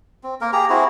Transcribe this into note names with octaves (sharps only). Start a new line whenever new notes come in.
C4
A#3 A#4
G4 G#4 A#5
C4 E4 F#4 G#4